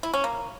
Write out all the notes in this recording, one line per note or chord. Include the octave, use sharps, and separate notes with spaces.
E4
C#4
A#3